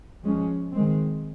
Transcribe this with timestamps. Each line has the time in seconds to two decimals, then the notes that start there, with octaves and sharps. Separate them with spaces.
0.23 F3 G#3 C#4
0.72 D#3 G#3 C4